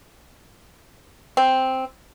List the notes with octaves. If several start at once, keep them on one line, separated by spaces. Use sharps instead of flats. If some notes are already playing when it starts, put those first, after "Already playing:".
C4